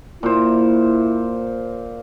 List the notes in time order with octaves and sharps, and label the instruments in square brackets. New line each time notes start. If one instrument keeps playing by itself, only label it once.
[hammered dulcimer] A#2 C5 [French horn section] E4